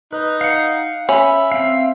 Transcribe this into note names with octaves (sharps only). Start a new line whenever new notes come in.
D#4 B4
F5 F#5
C#4 E5 B5
C4 F5